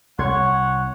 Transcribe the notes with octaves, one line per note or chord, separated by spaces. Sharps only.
C2 C#5 F#5 C6 G#6 C#7